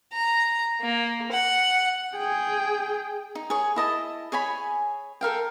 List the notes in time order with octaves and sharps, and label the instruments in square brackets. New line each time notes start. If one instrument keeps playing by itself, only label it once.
[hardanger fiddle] A#5
A#3
F#5
[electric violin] G#4 G5
[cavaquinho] D#4
G#4 C#5
E4 D#5 A5
G#4 C#5 G#5 B5
A4 A#4 F5 G5